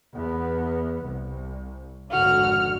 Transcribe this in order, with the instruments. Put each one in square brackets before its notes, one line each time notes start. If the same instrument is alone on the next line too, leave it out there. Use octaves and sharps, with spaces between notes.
[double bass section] E2 B3
C2
[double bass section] G#1 F2 D3 [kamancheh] F#4 F6